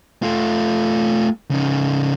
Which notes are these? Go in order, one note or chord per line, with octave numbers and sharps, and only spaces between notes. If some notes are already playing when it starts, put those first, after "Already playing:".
A3 F4
C#3 D#4